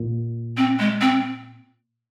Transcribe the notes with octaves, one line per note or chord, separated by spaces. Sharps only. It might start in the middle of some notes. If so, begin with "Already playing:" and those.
Already playing: A#2
C4
G#3
C4